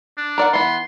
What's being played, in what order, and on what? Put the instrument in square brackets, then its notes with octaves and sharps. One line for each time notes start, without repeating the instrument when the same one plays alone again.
[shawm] D4
[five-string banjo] A#4 D5 F#5
[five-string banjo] E3 B3 [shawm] C6